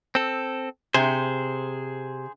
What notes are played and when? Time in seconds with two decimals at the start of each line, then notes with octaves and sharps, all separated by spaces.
0.15 C4 A4
0.94 C3 G#4 C5